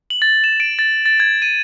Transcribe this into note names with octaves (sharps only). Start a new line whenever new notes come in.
F#7
A6
E7
D7
A6
A6
G#6
D#7